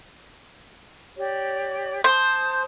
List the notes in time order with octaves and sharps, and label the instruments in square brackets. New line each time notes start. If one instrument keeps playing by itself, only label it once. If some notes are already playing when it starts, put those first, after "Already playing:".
[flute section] G4 C#5 D5
[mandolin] C5 [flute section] A5 D#6 G6